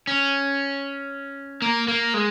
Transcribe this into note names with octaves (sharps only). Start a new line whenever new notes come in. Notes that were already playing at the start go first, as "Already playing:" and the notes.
C#4
A#3
A#3
G#3